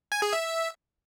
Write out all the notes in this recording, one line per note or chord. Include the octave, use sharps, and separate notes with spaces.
G#5
G#4
E5